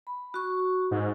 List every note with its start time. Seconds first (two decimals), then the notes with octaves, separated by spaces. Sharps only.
0.07 B5
0.34 F#4 C#6
0.91 G#2